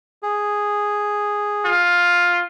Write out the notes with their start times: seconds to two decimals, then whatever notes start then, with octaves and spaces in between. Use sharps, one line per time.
0.23 G#4
1.65 F4